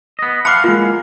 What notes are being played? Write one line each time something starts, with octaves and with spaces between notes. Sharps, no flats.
B3 D#5
F5 F#5 A5 B5 D6
G#3 A#3 F4